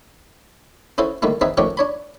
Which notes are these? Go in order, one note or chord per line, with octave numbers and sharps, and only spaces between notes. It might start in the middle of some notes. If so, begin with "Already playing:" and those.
C#4 E4 F#4 A4 C5
D3 D#3 G3 A3 A#3
C4 D#4 G#4 B4 E5
D#3 F3 A3 C#4 F#4 G4
D4 C#5 B5